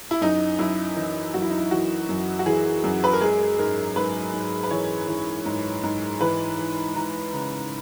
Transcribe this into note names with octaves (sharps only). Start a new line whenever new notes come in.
E4
F#2 D#4
F#2 E4
E3 D#4
F#2 F#4
E4
D#4
E4
E3 F#4
F#2
F#4
E3 G#4
F#2
B4
A#4
G#3 G#4
G#2 A#4
G#2 B4
G#2
B4
E3 C#5
E3
G#2
G#2
E3 B4
E3
E3 A#5
C#3